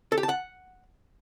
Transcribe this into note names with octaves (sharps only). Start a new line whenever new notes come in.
A4
G4
A5
F#5